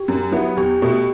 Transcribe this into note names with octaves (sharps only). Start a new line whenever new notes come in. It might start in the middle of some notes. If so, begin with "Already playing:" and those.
Already playing: G4
F#2
F#3 B3 E4
E2 G4
B2 A3